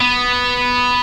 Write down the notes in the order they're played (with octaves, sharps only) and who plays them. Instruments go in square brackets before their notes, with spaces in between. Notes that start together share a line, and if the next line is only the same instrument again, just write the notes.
[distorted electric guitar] B3